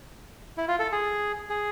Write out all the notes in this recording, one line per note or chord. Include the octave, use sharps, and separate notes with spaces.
E4
F4
A4
G#4
G#4